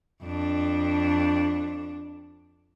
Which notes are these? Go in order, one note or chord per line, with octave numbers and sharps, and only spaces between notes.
F2 D4